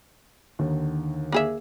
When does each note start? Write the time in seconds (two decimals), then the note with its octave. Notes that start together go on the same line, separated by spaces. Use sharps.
0.59 D#2 D3 D#3
1.32 A#3 G#4 E5